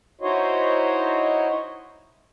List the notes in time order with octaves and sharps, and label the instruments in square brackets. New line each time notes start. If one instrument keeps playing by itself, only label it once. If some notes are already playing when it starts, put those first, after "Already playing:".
[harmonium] D#4 E4 F#4 C5 C#5 D#5